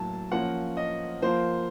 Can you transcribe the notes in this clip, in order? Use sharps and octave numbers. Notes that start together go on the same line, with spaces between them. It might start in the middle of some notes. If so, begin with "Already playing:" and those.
Already playing: A2 F#3 A#3 A5
F3 A#3 C#4 F4 F#5
D#5
F3 A#3 F4 C5